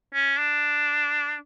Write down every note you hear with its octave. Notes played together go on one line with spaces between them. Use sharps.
C#4
D4